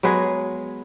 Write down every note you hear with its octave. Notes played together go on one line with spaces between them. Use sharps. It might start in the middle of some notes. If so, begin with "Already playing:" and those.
F#3 G#3 B3 G#4